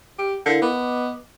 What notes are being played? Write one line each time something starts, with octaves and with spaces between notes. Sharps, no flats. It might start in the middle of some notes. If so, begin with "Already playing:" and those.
G4
D3 E4 A#4 F5
B3 D#5 D6